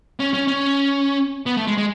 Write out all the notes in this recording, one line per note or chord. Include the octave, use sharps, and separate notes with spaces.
C#4
C#4
C#4
B3
A3
G#3
G#3